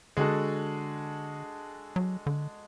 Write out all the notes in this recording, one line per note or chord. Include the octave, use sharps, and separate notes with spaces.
D3 G#3 D4 F#4 A4
F#3
D3